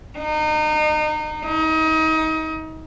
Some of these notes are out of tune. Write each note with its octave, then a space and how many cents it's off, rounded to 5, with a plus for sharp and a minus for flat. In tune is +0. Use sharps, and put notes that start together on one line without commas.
D#4 -30
D#4 +30